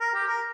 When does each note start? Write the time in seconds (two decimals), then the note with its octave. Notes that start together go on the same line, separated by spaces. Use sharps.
0.01 A#4
0.14 G4
0.28 A#4